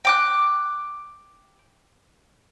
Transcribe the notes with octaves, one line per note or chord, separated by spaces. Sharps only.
G5 D6 F#6